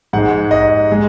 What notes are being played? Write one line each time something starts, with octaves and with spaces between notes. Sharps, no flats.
G#2 G#3 F#5
D#5
G#3